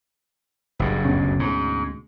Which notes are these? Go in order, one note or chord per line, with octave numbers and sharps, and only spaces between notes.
F#1 G2
D2 B2 C#4
G#2